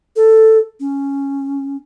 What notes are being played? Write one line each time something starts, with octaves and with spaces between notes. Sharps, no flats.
A4
C#4